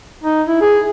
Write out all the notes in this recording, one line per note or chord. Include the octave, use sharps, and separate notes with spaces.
D#4
E4
G#4